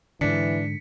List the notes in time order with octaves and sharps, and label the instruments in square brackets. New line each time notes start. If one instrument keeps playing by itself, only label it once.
[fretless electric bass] G#2 D3 [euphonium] E3 [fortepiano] D4 [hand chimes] B6 C#7